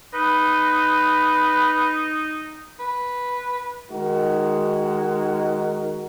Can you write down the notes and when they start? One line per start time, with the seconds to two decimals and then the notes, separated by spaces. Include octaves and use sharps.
0.14 D#4 B4
2.79 B4
3.91 D#3 G#3 D#4 F#4 A#4